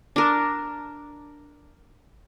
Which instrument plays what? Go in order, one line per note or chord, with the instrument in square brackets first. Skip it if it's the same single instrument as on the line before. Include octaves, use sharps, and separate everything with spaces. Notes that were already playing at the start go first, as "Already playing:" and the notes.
[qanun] D4 A#4